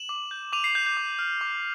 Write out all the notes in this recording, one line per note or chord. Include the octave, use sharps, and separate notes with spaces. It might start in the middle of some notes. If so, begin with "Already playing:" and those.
Already playing: E7 F#7
D6
G6
D6 D#7 F7
C7
G6
G6
D6
F6
D6